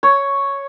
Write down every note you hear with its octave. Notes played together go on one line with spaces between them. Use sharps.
C#5